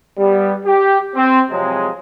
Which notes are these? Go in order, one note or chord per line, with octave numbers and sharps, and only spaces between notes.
G3 B3
G4
C4
C3 F3 F#3 G#3